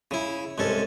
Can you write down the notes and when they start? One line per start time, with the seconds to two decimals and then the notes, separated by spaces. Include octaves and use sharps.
0.11 C#3 E4
0.58 C2 G#2 C#4 A4